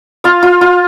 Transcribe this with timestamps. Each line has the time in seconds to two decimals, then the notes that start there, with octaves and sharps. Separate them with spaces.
0.24 F4 F5
0.43 F4
0.61 F4